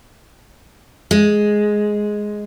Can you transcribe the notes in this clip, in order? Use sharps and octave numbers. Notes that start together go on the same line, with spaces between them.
G#3